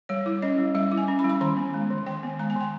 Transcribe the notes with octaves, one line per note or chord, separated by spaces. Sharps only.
G3 C#5
E4
C#4 D#5
G3
G3 E5
E4
G#5
C#4
B5
G3
B5
D#3 A#5
B3
G#3
D#3
D#3 G5
B3
G#3 A#5
G#5
D#3 G5